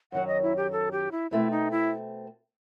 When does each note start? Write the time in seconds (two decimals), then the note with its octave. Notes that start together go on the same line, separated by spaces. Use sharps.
0.12 F#2 D#3 F#3 F#5
0.28 D#5
0.42 E4
0.57 G4
0.72 A4
0.92 G4
1.12 E4
1.31 B2 A3 C4 E4
1.51 D#4
1.71 E4